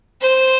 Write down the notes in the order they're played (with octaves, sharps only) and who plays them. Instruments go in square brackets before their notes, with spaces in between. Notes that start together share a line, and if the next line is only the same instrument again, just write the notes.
[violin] C5